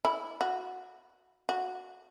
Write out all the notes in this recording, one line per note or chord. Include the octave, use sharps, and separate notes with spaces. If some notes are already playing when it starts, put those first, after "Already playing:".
E4
F#4
F#4